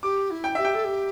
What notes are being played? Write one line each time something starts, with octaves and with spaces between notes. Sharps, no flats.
G4 D6
E4
G5
G4 E5
G5
A4
G4